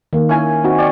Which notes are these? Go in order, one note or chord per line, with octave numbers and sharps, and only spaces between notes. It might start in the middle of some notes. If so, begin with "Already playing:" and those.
D#3 A#3
C#4 E4 G#5
C4 D#4 F#4
D5 G5 C#6